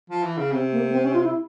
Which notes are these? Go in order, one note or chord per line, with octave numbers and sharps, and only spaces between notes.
F3
E3
C#3
C3 C4
A#3
A#3
C4
C#4
F4
E4